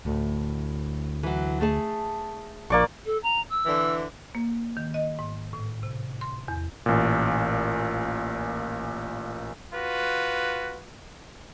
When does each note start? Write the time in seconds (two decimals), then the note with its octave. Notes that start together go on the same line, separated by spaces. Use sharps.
0.05 D2 A2
1.23 E3 F#3
1.61 A3 G#4 A5
2.70 A#1 A#3 D5 C#6
3.05 A4
3.22 A#5
3.49 E6
3.66 D3 E3
4.35 A#3
4.77 D#3
4.94 D#5
5.19 G#2
5.53 A2
5.83 C3
6.21 C6
6.48 E2
6.86 A1 A#2
9.73 F4 F#4 B4